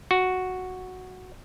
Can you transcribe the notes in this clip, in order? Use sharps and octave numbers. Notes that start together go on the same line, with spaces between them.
F#4